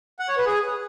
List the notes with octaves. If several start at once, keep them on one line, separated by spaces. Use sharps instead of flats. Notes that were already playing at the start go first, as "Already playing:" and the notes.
F#5
C#5
B4
G#4